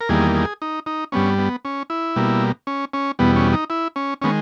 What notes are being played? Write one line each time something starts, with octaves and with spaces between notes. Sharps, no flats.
A#4
E2 D#3 G3 A#3 G#4
G#4
D#4
D#4
G2 G3 B3 C#4
B3
C#4
E4
B2 G3 A#3
C#4
C#4
E2 B2 G3 B3
C#4
D#4
E4
C#4
D#3 G#3 B3 C#4